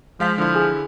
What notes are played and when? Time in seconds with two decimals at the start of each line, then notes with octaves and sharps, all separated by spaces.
0.20 F3 G#3 F5 B6
0.38 D3 F3 E4
0.55 G#4 G#5 D#6